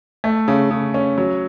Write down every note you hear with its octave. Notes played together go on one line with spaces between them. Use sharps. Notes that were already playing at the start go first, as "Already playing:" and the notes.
A3
C#3
C#3
C#4
F#3